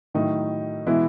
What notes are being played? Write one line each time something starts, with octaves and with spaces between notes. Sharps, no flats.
A2 D#3 F#3 A3 D#4
B2 E3 G#3 B3 E4